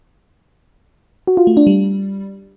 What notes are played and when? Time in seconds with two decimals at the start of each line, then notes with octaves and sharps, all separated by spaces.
1.27 F#4
1.37 F4
1.47 A3
1.57 D4
1.67 G3